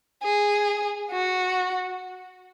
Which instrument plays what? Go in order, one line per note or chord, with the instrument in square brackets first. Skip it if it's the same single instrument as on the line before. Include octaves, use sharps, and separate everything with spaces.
[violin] G#4
F#4